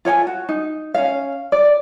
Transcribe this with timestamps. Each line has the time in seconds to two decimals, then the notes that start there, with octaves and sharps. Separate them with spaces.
0.05 F4 C#5 G5 G#5
0.27 F#4
0.49 D#4
0.94 C#4 F5
1.52 D5